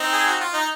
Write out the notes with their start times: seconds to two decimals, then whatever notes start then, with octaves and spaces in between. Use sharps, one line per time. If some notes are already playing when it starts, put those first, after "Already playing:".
Already playing: C4 D#4
0.13 G#4
0.27 F#4
0.40 F4
0.54 D#4